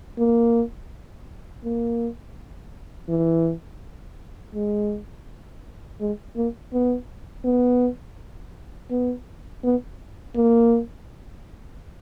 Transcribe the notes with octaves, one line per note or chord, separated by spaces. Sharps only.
A#3
A#3
E3
G#3
G#3
A#3
B3
B3
B3
B3
A#3